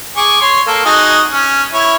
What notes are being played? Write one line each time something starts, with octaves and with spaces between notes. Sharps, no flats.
G#4 C#6 D6
C#5 C6
A#3 A4
D#4 F#4 G#4
C#4
E4 C#5